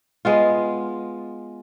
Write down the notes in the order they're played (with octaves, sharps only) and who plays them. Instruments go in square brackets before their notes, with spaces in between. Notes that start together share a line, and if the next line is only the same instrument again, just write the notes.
[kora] G#3 B3 F4